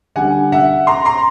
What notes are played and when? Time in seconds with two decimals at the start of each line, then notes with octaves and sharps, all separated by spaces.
0.16 D3 G3 F#5 G#5
0.52 E5 F#5
0.87 A#5 C6
1.05 A#5 C6